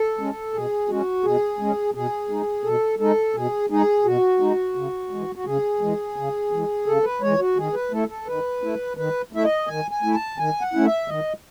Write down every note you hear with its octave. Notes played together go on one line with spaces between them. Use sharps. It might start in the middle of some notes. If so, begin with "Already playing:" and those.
Already playing: A4
G#3 C#4
B2 G#4
G#3 C#4 F#4
B2 G#4
G#3 C#4
B2 G#4
G#3 D#4
B2 A4
G#3 D#4 A4
B2 G#4
G#3 D#4 G#4
B2 F#4
G#3 D#4
C#3
G#3
E3
F#4
C#3 G#4
E3 G#3
C#3
E3 G#3
C#3 A4
B4
E3 G#3 C#5
F#4
D#3 G#4
B4
A3 E4 A4
A4
D#3 B4
A3 E4
D#3 B4
A3 E4 E5
D#5
D#3 G#5
G#5
A3 E4
A5
D#3 G#5
F#5
A3 C#4 E4
E5
D#3 D#5